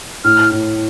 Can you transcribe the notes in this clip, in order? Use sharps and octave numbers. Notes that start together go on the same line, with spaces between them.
A2 F6
A2